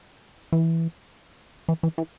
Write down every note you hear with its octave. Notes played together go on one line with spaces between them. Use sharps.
E3
E3
E3
E3